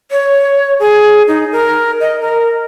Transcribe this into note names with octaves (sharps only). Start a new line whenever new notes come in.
C#5
G#4
D#4
A#4
D#5
A#4